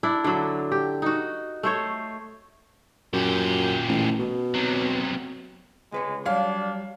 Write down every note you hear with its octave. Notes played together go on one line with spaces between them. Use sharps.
D4 E4
D3 F#3
G4
D#4 F#4
A3 C5 C#5
F#2 A#2 G4
A1
B2
C3 F#3
C#2 G#3 B4 C#5
F#3 G3 D4 C#5 F5